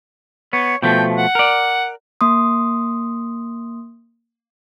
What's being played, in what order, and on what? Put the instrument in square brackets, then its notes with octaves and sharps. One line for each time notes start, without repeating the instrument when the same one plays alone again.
[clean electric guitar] B3 [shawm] C#5
[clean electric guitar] B2 F3 A3 [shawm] G5
[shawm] F#5
[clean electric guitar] A#4 D5
[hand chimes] A#3 C6 D#6